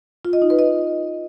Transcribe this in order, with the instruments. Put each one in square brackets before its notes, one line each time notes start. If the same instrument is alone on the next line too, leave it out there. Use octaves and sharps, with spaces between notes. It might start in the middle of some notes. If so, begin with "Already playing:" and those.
[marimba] F4
D#5
D#4
B4
D#5